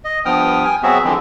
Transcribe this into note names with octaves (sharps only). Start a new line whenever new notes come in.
D#5
G2 F3 B3 G5 D#6 F6
G5 G#5
F#3 B3 C4 F#4 G#4 E5
D3 E3 F3 G#3 C4